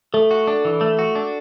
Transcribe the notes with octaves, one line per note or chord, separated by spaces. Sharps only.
A3 A4
F#4
D4
E3
A3
F#4
D4